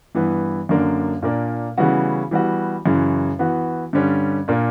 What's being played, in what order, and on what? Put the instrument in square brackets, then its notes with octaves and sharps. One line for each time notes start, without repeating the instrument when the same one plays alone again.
[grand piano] G2 E3 B3
F#2 D3 A#3 D4
A#2 A#3 D4
C#3 E3 G3 B3 F#4
E3 G3 B3 F#4
F#2 C#3 E3
E3 B3 F#4
G2 D3 G3 C#4
A#2 A#3 D4